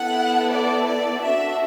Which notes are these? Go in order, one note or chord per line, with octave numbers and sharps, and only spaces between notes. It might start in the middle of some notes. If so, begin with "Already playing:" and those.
Already playing: B3 E4 A4 F#5
D5
D5
D4 F#4 A4 E5